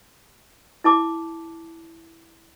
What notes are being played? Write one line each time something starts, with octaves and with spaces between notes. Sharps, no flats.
E4 A5 D6